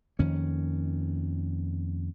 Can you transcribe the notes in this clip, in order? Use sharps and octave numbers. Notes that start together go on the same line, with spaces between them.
F2 D#3 A#3 C#4